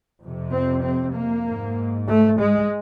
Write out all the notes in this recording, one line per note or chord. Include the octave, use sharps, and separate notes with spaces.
F2 C3
C4
C4
A#3
G#2
A3
G#3